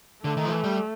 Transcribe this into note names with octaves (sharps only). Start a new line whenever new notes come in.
D3 A3
D#3
F3
E3
G3